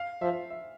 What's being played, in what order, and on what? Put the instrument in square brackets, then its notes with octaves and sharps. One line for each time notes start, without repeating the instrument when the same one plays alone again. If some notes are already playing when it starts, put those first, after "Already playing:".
Already playing: [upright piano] F5
[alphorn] F3 [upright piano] E5
[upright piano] E5